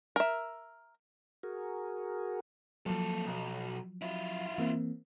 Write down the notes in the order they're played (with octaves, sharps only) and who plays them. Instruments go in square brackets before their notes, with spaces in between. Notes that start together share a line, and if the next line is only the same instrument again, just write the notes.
[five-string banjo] A#4 E5
[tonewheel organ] F#4 G#4 A#4
[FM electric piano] F3 F#3 [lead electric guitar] A#3 A4
[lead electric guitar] B1
E4 F4
[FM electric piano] E3 A#3 C4